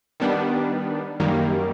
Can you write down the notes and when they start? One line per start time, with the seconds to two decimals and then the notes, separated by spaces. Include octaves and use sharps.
0.20 D#3 G3 B3 D4
1.20 F#2 D#3 G3 A#3